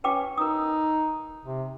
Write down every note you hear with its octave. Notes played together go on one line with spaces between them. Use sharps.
C#4 B4 G5 D6
D#4 A#4 D#6
C3